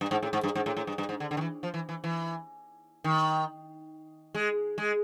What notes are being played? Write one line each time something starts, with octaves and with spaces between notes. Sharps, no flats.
G2
G#2
A2
G#2
G2
G#2
A2
A2
G2
G2
G#2
D3
D3
D#3
E3
F3
E3
E3
E3
D#3
G#3
G#3